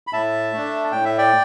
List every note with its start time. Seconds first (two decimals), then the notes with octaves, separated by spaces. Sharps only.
0.07 B5
0.13 A2 E5 A5
0.52 A3 D4
0.92 A2 G5
1.05 E5
1.18 D5 G5